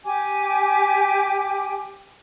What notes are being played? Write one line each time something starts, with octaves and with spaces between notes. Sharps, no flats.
G4 G5 G#5 D6